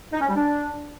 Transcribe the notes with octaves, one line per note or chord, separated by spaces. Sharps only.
D#4
C#4
G3
D4